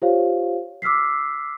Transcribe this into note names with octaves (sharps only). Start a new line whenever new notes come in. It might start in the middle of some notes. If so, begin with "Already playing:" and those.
F4 G4 C5 C#5 F5
D6 E6 F6 B6 C7